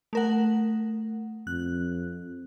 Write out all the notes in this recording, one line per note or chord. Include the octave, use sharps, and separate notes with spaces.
A3 A#4 F#5
F2 F#6